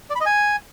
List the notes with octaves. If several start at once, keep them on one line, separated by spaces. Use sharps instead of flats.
D5
B5
D#5
G#5